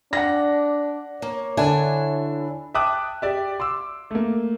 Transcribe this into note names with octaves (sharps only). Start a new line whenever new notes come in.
D4 F#5 A#6
A#3 C#5
D3 D4 E4 G#5
E5 G5 A5 D6 D#6 F#6
G4 D5 E5
C6 D6 E6
A3 A#3